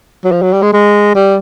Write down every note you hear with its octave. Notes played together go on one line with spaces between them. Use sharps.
F#3
F3
F#3
G3
G#3
G#3
G3